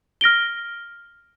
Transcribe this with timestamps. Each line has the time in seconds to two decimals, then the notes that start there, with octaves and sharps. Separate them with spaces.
0.21 F6 A#6 D7 G7